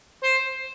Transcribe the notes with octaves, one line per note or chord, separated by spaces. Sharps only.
C5